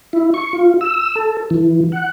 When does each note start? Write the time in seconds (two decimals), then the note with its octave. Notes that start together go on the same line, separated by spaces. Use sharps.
0.13 E4
0.34 C#6
0.53 F4
0.81 E6
1.16 A4
1.50 E3
1.92 F#5